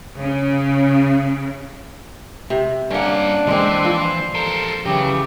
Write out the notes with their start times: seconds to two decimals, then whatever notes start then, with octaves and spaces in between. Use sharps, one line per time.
0.18 C#3
2.50 C3
2.90 G2 A#3 C#4 D4 F#5
3.47 E3 G#3 C4 C5
3.85 F3
4.35 A4 A#4
4.86 C#3 E3 F#3 G4